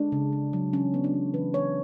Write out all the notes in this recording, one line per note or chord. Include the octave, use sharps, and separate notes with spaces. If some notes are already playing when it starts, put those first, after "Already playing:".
Already playing: G#3 D4
C#3
C#3
F#3
E3 C#4
B3
D4
B3
E3 B4
B3 C#5